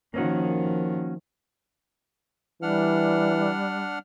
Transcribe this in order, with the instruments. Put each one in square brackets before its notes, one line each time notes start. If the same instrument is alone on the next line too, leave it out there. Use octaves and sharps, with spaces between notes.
[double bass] D#3 F3 [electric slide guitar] A#3 C#4 F#4
[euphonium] E3 [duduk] G3 [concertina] D4 F#5 F6